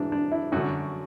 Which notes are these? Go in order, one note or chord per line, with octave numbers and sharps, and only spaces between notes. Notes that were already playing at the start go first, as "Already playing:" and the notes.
Already playing: G#2 E3 D4
D4
E4
F#2 D3 F#4